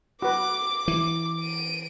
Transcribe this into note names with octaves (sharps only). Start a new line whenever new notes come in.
F#4 B4 D6
E3 D6
D7 D#7